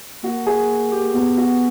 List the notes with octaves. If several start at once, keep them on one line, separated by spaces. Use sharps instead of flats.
A#3 F#4
G#4
G4
B3 F#4
F#4